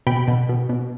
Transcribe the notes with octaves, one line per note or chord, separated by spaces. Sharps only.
B2 G5 B5
B2
B2
B2